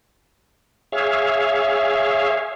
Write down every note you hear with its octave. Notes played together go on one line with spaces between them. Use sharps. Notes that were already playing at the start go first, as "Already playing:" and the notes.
G#4 C#5 E5 F5